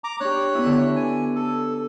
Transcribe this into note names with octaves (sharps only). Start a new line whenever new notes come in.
A#5 D6
D4 G4 C#5 F#6
B3 C#4 E4
D3 D4
G#5
A4